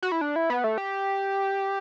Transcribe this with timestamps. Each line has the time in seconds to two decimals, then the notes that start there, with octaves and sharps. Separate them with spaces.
0.02 F#4
0.12 E4
0.21 D4
0.36 E4
0.50 B3
0.64 A3
0.78 G4